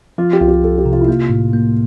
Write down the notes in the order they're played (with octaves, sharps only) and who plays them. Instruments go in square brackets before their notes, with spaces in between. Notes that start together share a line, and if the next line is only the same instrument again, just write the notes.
[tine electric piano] F3 [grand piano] F4
[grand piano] G4
[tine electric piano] C2 [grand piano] F4
[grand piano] G4
[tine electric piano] C2 [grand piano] A4
[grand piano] G4
[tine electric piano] C3
[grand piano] F4
E4
[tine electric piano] A#3 [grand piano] F4
[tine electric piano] A2
A#3